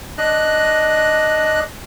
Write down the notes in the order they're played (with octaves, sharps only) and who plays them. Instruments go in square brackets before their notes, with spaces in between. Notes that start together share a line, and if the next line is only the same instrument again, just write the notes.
[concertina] D4 D#5 F#6